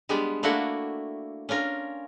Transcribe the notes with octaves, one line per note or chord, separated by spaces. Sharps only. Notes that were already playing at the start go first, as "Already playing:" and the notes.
G3 G#3 B3 D4 G4
A3 A#3 D4 E4 F#4 F#5
C#4 D4 F4 A#4